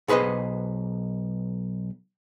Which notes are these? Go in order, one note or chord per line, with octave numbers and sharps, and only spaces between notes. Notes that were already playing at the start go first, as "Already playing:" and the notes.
B1 G#4 B4 C5 D#5